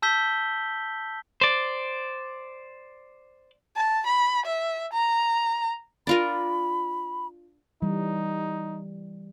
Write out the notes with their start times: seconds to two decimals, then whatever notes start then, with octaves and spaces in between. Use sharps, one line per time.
0.02 A5 E6 G6 B6 G7
1.41 C5 D5
3.77 A5
4.07 B5
4.46 E5
4.93 A#5
6.07 D4 F4 A#4 B5
7.82 E3 G3 D#4